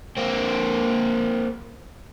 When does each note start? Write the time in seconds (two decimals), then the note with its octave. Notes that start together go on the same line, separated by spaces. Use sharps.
0.17 A#3 C4